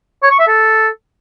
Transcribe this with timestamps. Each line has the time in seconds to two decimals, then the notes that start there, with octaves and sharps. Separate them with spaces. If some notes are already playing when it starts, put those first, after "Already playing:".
0.23 C#5
0.31 C#6
0.39 E5
0.47 A4